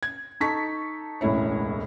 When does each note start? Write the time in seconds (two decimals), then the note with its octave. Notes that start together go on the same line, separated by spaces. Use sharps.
0.03 G#6
0.41 D#4 A4 A5 C#6 B6
1.21 E1 C#2 A2 E4 C#5